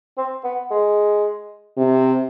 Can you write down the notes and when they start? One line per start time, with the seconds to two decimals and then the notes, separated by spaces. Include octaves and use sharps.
0.17 C4
0.44 B3
0.71 G#3
1.77 C3